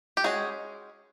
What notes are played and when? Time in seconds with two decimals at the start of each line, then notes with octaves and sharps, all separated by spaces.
0.17 G4
0.24 G#3 C#4 F#4 G#4